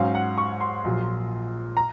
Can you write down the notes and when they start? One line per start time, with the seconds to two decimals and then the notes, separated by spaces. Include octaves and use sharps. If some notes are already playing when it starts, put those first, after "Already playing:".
Already playing: G#2 F#3 C#4 F5
0.15 F#5
0.38 C#6
0.61 C6
0.84 A#1 A#2 F#3
1.77 A#5